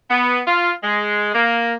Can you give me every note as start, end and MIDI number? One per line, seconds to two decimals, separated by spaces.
0.10 0.41 59
0.46 0.71 65
0.83 1.31 56
1.34 1.74 58